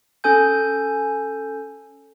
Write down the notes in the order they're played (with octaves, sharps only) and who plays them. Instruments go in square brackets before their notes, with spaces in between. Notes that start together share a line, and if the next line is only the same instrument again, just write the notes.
[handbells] C#4 A4 G#5 G6